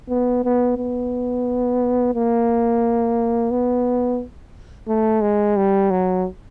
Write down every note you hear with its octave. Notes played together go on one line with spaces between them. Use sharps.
B3
B3
B3
A#3
B3
A3
G#3
G3
F#3